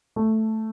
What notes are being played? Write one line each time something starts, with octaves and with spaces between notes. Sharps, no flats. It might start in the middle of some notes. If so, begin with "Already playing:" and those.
A3